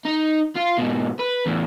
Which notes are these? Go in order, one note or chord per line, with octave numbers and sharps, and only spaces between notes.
D#4
F4
G#2 B2
B4
E2 A2